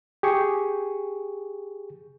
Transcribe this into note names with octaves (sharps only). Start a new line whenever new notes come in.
G4 G#4 C#6